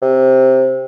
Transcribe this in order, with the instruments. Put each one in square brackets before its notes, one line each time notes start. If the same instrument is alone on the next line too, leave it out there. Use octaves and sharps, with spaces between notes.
[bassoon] C3